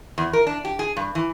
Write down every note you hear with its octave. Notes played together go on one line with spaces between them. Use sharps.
E2
A#4
D4
G4
G#4
G2
E3